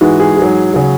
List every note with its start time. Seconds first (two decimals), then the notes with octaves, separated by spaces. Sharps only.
0.01 G#2 E3 G#3 F#4
0.20 G#4
0.37 G#2 F#3 G#4
0.74 C#3 F#3